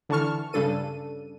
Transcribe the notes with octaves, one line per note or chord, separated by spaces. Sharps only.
D3 E3 A5 C#6 F6
G2 C#3 D4 A4 D#7